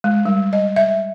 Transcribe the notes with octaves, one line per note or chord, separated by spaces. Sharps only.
G#3
G3
D#5
E5